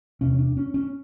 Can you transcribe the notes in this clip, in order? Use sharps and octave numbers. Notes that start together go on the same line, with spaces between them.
E2 C3 C#4
D4
C#4
C#4